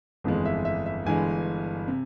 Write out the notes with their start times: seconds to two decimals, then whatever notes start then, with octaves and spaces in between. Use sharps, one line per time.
0.24 G1 F2 E3 G#3
0.45 E5
0.65 E5
0.86 E5
1.06 G1 G2 E3 G#3 G#5
1.88 C3